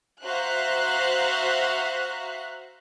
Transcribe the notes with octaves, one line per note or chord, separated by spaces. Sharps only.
F#4 C5 E5 F5 A#5 F#6